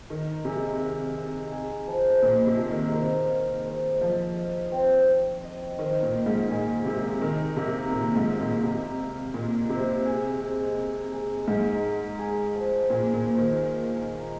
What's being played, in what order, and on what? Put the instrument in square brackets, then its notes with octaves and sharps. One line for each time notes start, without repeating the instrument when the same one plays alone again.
[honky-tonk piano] D#3 [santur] D#4
[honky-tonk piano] C3 [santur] G#3
[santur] F5
D#4
G#4
F3
[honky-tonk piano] A#2 [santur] D#5
[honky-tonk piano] C3
[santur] D#4
[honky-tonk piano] D#3
[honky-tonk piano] D#3 [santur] C5
[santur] F5
C5
[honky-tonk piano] F3 [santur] D#5
[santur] F5
C4
C5
D#5
[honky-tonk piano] D#3 [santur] C5
[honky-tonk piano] A#2
[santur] D#5
[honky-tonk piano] G#2
[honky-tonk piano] A#2 [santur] G#4
[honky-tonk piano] C3 [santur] A#3
[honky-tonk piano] D#3 [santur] A#4
[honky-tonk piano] C3 [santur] A#3
[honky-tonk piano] A#2 [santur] A#4
[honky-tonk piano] G#2
[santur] D#5
[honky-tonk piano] A#2
[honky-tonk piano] C3 [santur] A#4
[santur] F5
[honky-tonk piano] A#2 [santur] D#4
[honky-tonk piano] C3 [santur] C5
[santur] G#4
G#3
A#4
G#3
[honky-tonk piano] G#2 [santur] D#4
[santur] A#4
G#4
F3
[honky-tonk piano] A#2 [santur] G#4
[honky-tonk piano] A#2
[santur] C5
[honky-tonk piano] D#3
[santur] F5
D#4